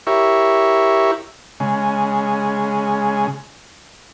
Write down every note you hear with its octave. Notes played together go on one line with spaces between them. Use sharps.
E4 G4 A#4 C#5 E5 C#6
C#3 G#3